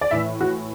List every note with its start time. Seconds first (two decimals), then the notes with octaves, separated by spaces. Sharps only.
0.01 D5
0.11 A2 E3 E5
0.41 F#4